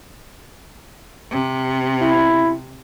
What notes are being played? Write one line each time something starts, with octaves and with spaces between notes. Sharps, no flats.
C3
E4